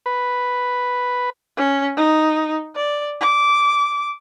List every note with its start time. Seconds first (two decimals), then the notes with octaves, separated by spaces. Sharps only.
0.06 B4
1.57 C#4
1.97 D#4
2.76 D5
3.21 D6